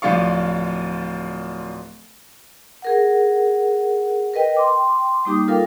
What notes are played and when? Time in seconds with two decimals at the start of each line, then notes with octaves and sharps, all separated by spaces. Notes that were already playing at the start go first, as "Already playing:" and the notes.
0.02 D1 F3 F4 D5 F5 C#6
2.82 G#4 A#4 F#5
4.34 A#4 B4 D#5 G5
4.56 G5 C6 D6
5.25 G3 A#3 D#4 G4 D6 D#6
5.48 F4 A4 A#4 F5 G5